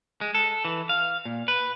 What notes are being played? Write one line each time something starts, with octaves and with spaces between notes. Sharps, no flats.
G#3
A4
E3
F5
A#2
B4